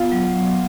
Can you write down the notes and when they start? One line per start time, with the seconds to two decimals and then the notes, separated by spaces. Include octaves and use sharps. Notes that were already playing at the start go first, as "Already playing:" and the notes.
Already playing: B3 F4
0.12 F#3